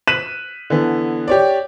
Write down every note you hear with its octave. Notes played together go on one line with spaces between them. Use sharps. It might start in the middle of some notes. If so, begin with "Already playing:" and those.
F#6 B6 D#7 E7 F#7
D3 E3 B3
G4 C#5 D5